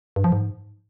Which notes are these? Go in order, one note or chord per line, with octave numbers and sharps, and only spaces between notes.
G2
F3
G#2